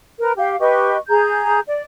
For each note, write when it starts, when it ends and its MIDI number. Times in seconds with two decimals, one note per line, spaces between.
0.19 0.31 70
0.19 0.31 71
0.37 0.58 67
0.37 0.58 77
0.60 0.96 67
0.60 0.96 71
0.60 0.96 75
0.60 0.96 85
1.08 1.59 68
1.08 1.59 82
1.08 1.59 91
1.67 1.84 74